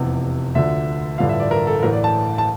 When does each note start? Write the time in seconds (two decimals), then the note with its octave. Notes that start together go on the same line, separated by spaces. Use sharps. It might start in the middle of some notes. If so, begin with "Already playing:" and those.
Already playing: F1 E2 C3
0.55 D2 D3 F3 E5
1.18 A1 G2 D3 F3 F5
1.29 E5
1.40 D5
1.51 A#4
1.67 A4
1.83 A1 A2 E3 A#4
1.93 D5
2.04 A5
2.38 A5